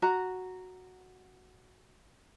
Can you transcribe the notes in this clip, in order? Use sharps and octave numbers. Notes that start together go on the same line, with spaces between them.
F#4 A#5